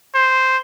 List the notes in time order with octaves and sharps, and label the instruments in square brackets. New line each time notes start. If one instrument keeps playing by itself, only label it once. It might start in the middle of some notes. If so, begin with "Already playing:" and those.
[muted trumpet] C5